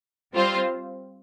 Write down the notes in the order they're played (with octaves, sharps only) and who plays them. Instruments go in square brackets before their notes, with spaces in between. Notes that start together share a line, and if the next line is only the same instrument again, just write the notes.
[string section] G3 C4 F4 C5